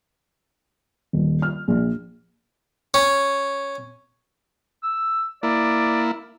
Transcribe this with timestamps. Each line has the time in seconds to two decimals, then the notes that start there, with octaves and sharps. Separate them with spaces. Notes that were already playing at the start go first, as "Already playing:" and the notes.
1.13 D#1
1.42 F6
1.68 A#1
2.94 C#4
4.83 E6
5.43 A#3 E4 D5